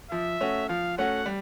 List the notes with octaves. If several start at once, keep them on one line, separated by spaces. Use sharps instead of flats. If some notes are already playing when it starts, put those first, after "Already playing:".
F3 E5
A3 C#4 F#4
F3 F5
A3 C#4 F#4 F#5
G3